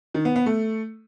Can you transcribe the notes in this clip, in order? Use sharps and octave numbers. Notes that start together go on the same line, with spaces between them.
D#3
B3
B3
A3